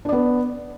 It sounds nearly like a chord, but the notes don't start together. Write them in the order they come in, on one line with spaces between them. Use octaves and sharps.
D4 D5 B3